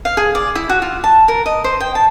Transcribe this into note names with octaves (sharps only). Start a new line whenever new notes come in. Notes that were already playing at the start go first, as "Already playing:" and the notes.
F5
G#4
D5
E4
F#4
F4
A5
A#4
D#5
C5
G5
A5